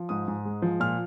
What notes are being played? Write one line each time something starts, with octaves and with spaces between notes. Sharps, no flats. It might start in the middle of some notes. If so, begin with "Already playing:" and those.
Already playing: F3
G#2 D#6
G#2
G#3
F3
A#2 F6